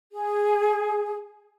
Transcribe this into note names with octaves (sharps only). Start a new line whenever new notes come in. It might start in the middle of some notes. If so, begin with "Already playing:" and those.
G#4